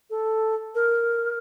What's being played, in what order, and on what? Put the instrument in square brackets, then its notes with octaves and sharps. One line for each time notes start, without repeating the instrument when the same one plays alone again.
[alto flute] A4
A#4